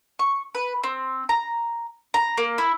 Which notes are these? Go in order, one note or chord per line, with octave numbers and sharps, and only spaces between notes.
C#6
B4
C4
A#5
A#5
A#3
E4